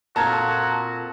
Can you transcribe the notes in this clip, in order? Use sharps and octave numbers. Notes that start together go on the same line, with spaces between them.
A#2 C4 F4 F#4 A4 A5 A#5 G#6